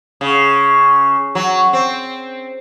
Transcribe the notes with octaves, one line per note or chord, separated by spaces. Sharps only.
C#3
F#3
C4